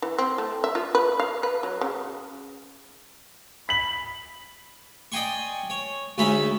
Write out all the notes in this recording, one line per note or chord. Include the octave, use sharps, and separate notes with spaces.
E3
C4
A3
E5
F4
B4
F5
B4
F#3
C#3
B5 B6 F#7
D5 D#5 G5 G#5 C6 C#6
C#5
D2 G#3 C#4 D#4 E5 B5